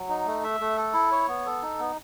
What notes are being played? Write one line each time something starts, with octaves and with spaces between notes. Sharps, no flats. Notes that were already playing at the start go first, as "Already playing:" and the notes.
Already playing: F#3
D#4
A3
E5
A3
A4
E4
C#5
B3
A4
D#4
B3